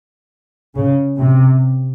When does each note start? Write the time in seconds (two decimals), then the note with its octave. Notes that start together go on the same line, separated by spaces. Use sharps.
0.75 C#3
1.18 C3